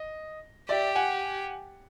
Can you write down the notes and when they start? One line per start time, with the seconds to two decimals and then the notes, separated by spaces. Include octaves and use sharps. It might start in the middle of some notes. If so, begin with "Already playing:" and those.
Already playing: D#5
0.69 G4 D5 E5
0.95 F#5 G#5